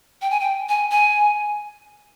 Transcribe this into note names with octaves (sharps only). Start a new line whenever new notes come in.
G5
G#5
G5
G#5
G#5